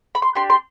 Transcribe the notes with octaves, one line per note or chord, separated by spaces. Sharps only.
B5
C6
D4 G4 C6
C6